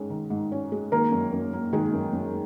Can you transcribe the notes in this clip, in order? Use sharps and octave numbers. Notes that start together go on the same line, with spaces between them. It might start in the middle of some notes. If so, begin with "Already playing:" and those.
Already playing: G#2 D#3 G#3 C#4
D#3
G#2
C#4
G#3
D#3 A#3 A#4
F#2
F#2
A#3
D#3 G#3 G#4
F#2
F#2